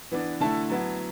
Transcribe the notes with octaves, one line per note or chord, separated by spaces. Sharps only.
E3 B3 D4
D3 A3 E4 A5
F#3 B3 E4